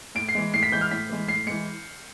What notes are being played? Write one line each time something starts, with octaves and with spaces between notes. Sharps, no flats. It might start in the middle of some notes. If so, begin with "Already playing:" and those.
A2 D7
C7
E3 G#3
A2 C7
B6
E3 G#3 G6
F6
A2 B6
E3 G#3
A2 C7
E3 G#3 C#7